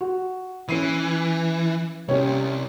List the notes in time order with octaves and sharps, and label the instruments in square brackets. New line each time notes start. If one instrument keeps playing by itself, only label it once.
[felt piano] F#4
[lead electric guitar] E3 [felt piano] C#4 C7 D#7
[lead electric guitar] C2 [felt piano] C#4 G4 C#5